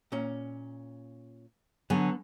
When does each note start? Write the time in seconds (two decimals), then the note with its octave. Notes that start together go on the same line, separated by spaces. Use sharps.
0.12 A#2 C#4
1.90 D3 F#3 B3 G#5